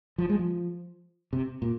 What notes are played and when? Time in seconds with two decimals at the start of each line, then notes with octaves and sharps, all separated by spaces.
0.18 F3
0.29 G#3
0.39 F3
1.33 C3
1.62 A#2